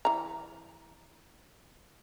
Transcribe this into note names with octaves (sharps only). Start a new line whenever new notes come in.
E3 A#5